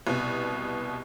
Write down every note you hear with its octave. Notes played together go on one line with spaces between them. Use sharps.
C2 B2